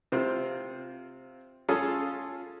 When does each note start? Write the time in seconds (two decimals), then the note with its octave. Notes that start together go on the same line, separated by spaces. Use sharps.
0.12 C3 C4 F4
1.69 C#4 F4 G#4 A4